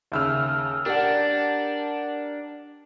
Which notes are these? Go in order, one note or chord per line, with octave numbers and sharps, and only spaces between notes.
D#2 C#3 E5 E6 F6
D4 G4 A#4 D5 F#5